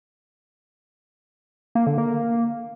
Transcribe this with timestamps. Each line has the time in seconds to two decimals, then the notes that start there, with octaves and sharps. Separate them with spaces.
1.75 A#3
1.87 D3
1.98 A#3